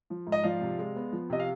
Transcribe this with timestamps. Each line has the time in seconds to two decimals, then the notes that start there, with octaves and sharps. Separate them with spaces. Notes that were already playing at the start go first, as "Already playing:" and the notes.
0.10 F3
0.27 G#2
0.32 D#5
0.43 F3 D5 F5
0.61 C3
0.79 G#3
0.96 B3
1.12 F3
1.30 C3 D#5
1.40 F5